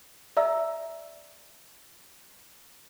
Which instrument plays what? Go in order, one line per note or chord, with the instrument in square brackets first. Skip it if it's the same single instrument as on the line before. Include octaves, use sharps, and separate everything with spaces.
[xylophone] D5 E5 A#5 E6